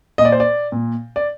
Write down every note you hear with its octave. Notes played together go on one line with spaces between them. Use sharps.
A#2 D#5
D5
C5
D5
A#2
D5